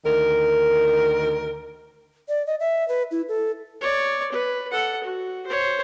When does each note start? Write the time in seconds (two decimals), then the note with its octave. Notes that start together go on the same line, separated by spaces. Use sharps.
0.05 D2 D#3 A#4
2.29 D5
2.47 D#5
2.60 E5
2.88 B4
3.11 E4
3.29 A4
3.81 C#5 D5
4.32 B4
4.71 A4 F#5
5.04 F#4
5.47 C5 C#5